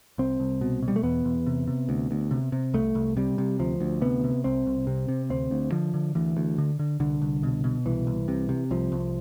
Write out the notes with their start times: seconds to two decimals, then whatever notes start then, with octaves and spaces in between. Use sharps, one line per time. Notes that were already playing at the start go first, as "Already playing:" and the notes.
0.18 C2 C4
0.40 C2
0.61 B2
0.83 B2
0.88 G3
0.96 A3
1.03 E2 B3
1.25 E2
1.46 C3
1.68 C3
1.89 D2
2.11 D2
2.31 C3
2.52 C3
2.74 C2 A3
2.95 C2
3.17 C3 G3
3.38 C3
3.59 D2 F3
3.80 D2
4.02 C3 B3
4.24 C3
4.44 C2 C4
4.66 C2
4.87 C3
5.08 C3
5.30 D2 C4
5.51 D2
5.72 D3 F3
5.94 D3
6.15 D2 E3
6.37 D2
6.58 D3
6.79 D3
7.00 C2 D3
7.22 C2
7.43 B2
7.64 B2
7.85 C2 E3
8.07 C2
8.28 C3
8.49 C3
8.71 C2 F3
8.92 C2